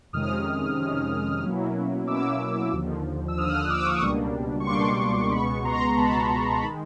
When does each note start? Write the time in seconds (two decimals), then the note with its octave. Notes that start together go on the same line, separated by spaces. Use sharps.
0.13 F2 C3 D#3 G#3 C#4 D#6 F6
0.78 F2 C3 D#3 G#3 C#4
1.43 B2 F#3 A#3 C#4 E4
2.07 B2 F#3 A#3 C#4 E4 D6 E6
2.73 D#2 D3 F3
3.28 E6
3.37 D#2 D3 F3 D#6 F6
3.50 F#6
3.54 D#6 F6
3.69 D6 E6
3.86 C#6 D#6
4.02 C#2 B2 G3 A#3 D4
4.60 C#6
4.67 C#2 B2 G3 A#3 D4 C6 D6
5.32 C#2 B2 G#3 B3 B5 C#6
5.64 A#5 C6
5.97 C#2 B2 G#3 B3 A5 B5
6.62 D#3 G#3 A5 B5